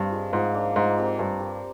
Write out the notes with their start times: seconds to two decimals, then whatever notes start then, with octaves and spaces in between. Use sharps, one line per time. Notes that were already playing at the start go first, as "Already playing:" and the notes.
Already playing: G2 A#3 C4
0.11 F4 G#4 D#5
0.33 G#2 F3
0.54 A#3 D4
0.76 G#2 G#3
0.98 C4 G4 A#4
1.19 G2 C4
1.40 G4 A#4 D5